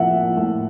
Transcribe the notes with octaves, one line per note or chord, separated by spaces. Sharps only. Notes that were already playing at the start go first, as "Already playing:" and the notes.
Already playing: A2 F3 A#3 E5 F#5
F3
A2